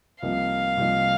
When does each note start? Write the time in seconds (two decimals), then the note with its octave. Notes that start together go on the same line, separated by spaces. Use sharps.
0.22 C2 C3 F3 A#3 D#4 F5
0.77 C2 C3 F3 A#3 D#4